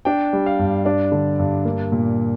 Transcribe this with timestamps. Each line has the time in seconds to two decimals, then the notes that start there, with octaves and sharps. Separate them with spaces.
0.05 D4 G5
0.33 G3
0.46 F5
0.59 G2
0.85 D4 D5
1.12 D3
1.39 G2
1.65 A#3
1.92 A#2